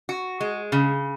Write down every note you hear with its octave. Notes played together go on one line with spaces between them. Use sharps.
F#4
G#3
C#3